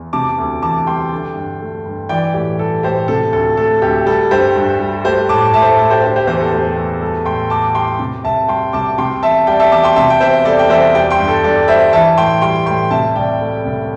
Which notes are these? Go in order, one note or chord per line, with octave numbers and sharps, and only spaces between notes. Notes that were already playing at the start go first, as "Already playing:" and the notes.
Already playing: E2
C3 A5 D6
D2
E3 A5 D6
G3 G5 C6
D3
G2
A3
G2
E3 D5 G5
A2 G4
G3 A4
A2 G4 C5
C3 A4
D2 A4
A3 A4
D2 G4
G3 A4
G2 G4 C5
G2
G3
A3 G4 C5
A2 A5 D6
A2 E5 A5
C5
A4
A3 A4
G4 C5
D3 G4 C5
G4 C5
E2 G4 C5
A4
A3 G4 C5
E2
G3 A4
A2 G5 C6
A2 A5 D6
G3 G5 C6
C3
C2 E5 A5
G3 G5 C6
C2 A5 D6
C3 G5 C6
E2 E5 A5
G3 D5 G5
E5 A5
E2 A5 D6
G5 C6
C3 E5 A5
G5
E2 C5 E5
G3 A4 D5
G5
E2 C5 E5
G3 D5 G5
G5 C6
G2
A4
G2 A4 D5
G3 C5 E5
E3 E5 A5
A2 G5 C6
G3 G5 C6
A2 G5 C6
C3 E5 A5
C2 D5 G5
A3
C2